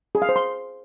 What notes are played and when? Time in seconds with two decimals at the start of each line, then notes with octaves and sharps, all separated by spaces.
0.15 G#4
0.22 F5
0.29 C5
0.36 C6